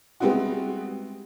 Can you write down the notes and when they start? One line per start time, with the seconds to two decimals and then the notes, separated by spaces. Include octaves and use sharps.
0.20 G3 G#3 B3 C4 E4 F#4